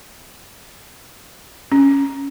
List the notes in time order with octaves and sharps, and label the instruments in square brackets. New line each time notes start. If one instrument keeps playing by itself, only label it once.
[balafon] C#4